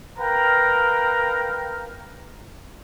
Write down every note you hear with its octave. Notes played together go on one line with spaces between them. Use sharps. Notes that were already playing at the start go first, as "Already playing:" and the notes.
A#4 B4 F5 G5 A#5